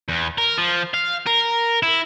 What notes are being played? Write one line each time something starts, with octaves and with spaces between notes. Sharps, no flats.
E2
A#4
F3
F5
A#4
E4